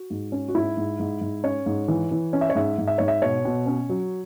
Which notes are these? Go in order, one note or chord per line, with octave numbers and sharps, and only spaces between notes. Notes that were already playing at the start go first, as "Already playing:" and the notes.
Already playing: F#4
G#2
C#4
F#4
G#2 E4
G#2
G#2
G#2
C#4 C#5
G#2
E3
E3
C#4
E5
C#5
G#2 E5
G#2
E5
G#2 C#5
E5
B2 C#5
B2
C#4
F#3